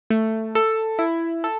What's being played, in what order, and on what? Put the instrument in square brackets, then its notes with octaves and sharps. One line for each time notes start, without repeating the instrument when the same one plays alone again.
[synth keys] A3
A4
E4
A4